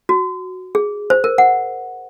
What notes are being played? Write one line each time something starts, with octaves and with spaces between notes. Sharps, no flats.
F#4
G#4
C5
A#4
F#5